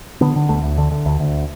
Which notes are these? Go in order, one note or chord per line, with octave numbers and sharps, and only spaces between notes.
D3 B3
D3
D2 A3
D2
D3
D3
D2
D2